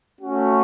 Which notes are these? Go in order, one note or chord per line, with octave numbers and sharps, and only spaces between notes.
A3 C#4 F#4